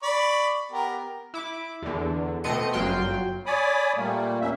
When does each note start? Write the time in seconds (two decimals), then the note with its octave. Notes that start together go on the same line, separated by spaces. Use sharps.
0.03 D5 B5 C#6
0.72 B3 G4 A#4
1.34 E4 D6
1.82 E2 D3
2.44 B2 A3 C4 D#5 C#7 D#7
2.73 G1 F#2 F#3 F4 G5 C6
3.46 C#5 D5 G#5 B5 D6 D#6
3.96 A#2 G3 A3 A#3
4.41 E2 A#3 C#4 E5